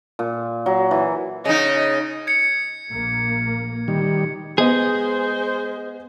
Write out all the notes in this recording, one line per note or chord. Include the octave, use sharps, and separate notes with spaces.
A#2
F#3
E3
C#3 D#4 D#5
G#6 C#7
A#1 A#3
D#3 G3
G#3 B3 G#4 C5 D#5